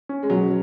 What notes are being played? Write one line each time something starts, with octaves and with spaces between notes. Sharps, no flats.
C#4
G#3
B2 F#3